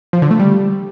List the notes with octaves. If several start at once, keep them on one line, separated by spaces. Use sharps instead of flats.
F3
D3
A3
G3